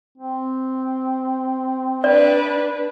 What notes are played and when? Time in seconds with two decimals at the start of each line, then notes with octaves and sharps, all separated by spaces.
0.18 C4
2.04 D4 B4 D5